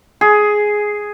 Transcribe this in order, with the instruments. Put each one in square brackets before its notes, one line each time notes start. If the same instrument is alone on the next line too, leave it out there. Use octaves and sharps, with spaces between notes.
[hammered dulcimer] G#4